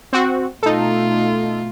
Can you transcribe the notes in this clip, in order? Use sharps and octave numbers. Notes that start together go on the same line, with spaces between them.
C4 F#4
B2 A3 D#4 F4 A4